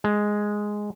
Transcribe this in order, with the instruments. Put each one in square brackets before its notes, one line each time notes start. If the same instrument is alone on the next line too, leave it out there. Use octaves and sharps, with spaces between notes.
[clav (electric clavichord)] G#3